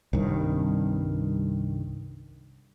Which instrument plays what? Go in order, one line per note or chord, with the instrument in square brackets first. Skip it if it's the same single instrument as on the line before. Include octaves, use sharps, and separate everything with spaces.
[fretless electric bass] C2 G2 D#3